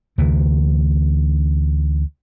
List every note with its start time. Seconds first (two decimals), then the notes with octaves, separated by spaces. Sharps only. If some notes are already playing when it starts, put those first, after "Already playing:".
0.18 D2 C3 E3